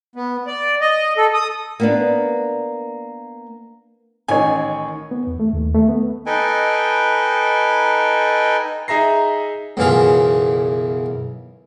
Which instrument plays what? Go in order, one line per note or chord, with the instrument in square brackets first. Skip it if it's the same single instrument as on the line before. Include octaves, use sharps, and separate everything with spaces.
[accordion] B3
D5
D#5
A4
D#6
[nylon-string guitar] A#3 B3 D4
[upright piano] A1 D#3 C#5 [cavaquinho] G#5
[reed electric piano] B3
E2
A3
D#2
A3
B3
[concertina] D#4 A4 B4 D#5 G5 G#5
[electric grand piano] D#4 G#4 E5 A#5 A#6 C7
[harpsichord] B1 F#2 C#3 E3 F4